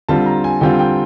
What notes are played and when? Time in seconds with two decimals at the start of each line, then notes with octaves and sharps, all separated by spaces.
0.09 D3 G3 C4 F4 A5
0.26 A#5
0.44 G#5
0.61 D3 G3 C4 F4 G5
0.79 G5